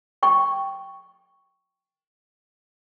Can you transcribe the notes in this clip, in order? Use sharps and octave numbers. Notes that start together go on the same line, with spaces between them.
G5 C#6